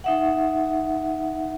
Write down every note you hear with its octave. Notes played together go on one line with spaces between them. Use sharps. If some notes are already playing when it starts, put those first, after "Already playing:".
D#4 E5 F#5